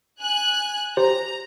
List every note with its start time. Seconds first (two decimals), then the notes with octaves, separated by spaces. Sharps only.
0.22 G#5 F#6
0.97 G4 C5 A#5